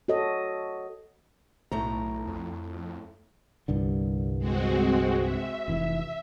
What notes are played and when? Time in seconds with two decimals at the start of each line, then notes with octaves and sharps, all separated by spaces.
0.08 F#4 A4 C#5 D#5
1.72 B1 A2 A3 A#5
2.27 F2
3.68 C2 G2 D3
4.39 G#3 C4 F#4
5.18 E5
5.68 F1 E3